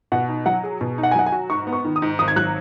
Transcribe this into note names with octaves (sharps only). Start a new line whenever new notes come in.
B2 F#5
D#4
F#3 F#5
G#4
B2
D#4
F#5
G#5
F#3 F#5
G#5
F#4
G#2 C#6
B3
C#6
D#3
D#6
G#2
G#1 D#6
G#6
F#3 F#6